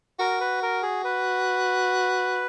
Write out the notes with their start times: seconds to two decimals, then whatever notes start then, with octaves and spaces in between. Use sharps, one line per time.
0.20 F#4 A#4
0.41 B4
0.63 A#4
0.83 G#4
1.04 B4